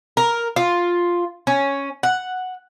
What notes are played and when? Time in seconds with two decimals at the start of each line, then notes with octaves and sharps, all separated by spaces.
0.17 A#4
0.56 F4
1.47 C#4
2.03 F#5